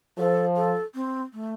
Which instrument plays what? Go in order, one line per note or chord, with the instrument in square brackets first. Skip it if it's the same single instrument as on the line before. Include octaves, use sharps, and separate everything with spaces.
[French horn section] F3 [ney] A4
[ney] A4
C4
A3